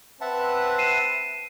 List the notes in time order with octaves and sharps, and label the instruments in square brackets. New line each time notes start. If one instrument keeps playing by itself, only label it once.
[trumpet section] C4 B4 [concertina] E5 F#5 A5
[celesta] C7 D#7 E7